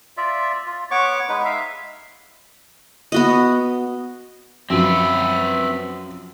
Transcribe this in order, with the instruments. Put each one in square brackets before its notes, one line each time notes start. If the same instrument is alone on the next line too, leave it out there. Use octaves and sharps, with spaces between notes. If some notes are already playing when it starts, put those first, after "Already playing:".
[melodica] F4 D5 E5
F4
B3 C#5 C#6 D6
G#3 D#4 B4
E5 F5
[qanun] B3 F#4 D#5
[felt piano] F#2 F3 [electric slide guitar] C4 B4 [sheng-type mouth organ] E5